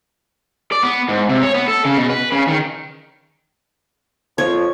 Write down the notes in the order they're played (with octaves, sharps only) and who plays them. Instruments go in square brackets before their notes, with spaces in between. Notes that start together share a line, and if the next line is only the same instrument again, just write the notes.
[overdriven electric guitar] D5
B3
G#2
C3
C#5
B3
A4
C#3
B2
B4
C#3
D#3
[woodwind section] F2 F3 [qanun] C#5